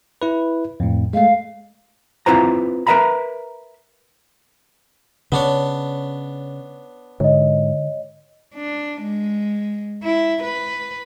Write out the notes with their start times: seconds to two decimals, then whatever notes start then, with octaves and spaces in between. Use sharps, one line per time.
0.22 E4 B4
0.80 F2 A2
1.13 G#3 A3 F5
2.26 C4 E4 F4 B4 C5 A#5
2.87 A#4 B4 C#5 E5 A#5 B5
5.32 C#3 B3 D4 C#5
7.20 G#2 D3 C#5 D#5
8.54 D4
9.02 G#3
10.04 E4
10.43 B4